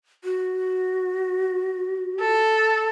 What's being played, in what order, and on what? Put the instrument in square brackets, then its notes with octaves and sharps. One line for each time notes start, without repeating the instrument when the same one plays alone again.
[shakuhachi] F#4
[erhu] A4